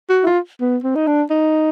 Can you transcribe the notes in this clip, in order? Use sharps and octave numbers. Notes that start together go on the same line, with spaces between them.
F#4
E4
F4
B3
C4
D#4
D4
D#4